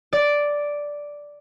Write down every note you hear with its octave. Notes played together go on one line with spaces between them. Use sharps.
D5